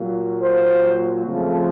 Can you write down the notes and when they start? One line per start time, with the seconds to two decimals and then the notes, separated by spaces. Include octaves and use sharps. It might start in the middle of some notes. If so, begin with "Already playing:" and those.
Already playing: A#2 F#3 A#3
0.41 C5
1.25 F2 C#3 F3 A3